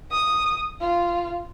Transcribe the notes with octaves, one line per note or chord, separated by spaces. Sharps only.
D#6
F4